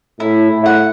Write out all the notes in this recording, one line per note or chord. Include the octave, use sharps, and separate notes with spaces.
A2 E4
A2
F#5